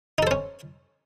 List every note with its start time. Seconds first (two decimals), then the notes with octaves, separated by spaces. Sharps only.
0.18 D#4
0.23 A4
0.27 C5
0.31 C#4